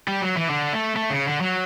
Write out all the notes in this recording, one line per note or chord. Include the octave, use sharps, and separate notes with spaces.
G3
F#3
E3
D3
A3
A3
C#3
D3
F#3